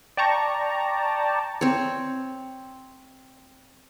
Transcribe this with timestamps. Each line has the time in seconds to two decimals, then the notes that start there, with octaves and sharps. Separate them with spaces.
0.17 D5 G5 A5 A#5 C#6
1.61 C4 C#5